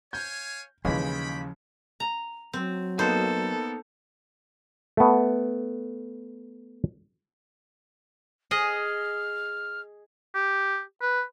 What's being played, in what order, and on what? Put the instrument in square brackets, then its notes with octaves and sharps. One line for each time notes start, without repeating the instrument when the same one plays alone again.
[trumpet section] C#5 F5 G#5 [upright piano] G6
[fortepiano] D#2 E3 G#3 [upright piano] C#3 [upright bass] F3 E4 [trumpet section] G5 B5
[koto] A#5
[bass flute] F#3 [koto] C4
[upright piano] A#3 B3 D#4 [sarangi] A4 [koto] C5
[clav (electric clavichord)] A3 B3
[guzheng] G#4 D#5 [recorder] F6
[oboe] G4
B4